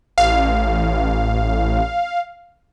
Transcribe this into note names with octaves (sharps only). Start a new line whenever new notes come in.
A1 F5